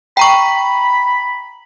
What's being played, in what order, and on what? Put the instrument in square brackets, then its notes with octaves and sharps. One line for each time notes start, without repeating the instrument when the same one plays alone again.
[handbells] G5 A#5 C#6 [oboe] B5